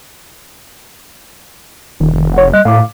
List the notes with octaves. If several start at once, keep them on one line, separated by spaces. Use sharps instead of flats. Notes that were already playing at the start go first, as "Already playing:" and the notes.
D#1 D#3
F1
C#5 F#5
G3 D#5 F#6
A2 F5 D6